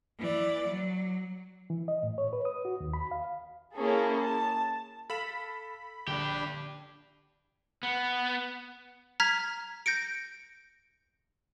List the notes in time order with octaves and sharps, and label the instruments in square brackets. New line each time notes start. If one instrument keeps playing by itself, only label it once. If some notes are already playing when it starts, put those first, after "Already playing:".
[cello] E3 D5
F#3
[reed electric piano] E3
D#5
A2
C#5
B4
D#6
F#4
D#2
B5
F5
[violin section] A#3 C#4 E4 G#4 A4
A5
[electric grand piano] A4 F5 E7 [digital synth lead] B5
[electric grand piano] A#1 [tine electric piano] D3 [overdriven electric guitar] D4 G4
[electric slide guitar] B3
[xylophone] A#5 F6 G#6 B6
G6 A#6 C#7 D7